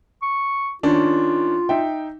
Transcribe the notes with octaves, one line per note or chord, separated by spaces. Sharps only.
C#6
D#3 C#4 D4 F4
D#4 E5 G5